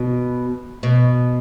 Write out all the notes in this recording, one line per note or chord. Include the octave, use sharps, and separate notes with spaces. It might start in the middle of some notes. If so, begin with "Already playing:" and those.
Already playing: B2
B2